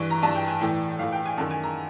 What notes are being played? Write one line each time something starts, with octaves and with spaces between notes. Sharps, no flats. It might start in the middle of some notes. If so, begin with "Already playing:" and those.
Already playing: G2 E3 C#6
A#5
G2 E3 A5
G5
G#5
A2 E3 G5
A2 E3 F5
G5
G#5
F#2 D#3 A5
G#5
A#5